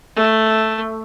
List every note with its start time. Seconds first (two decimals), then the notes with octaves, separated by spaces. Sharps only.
0.16 A3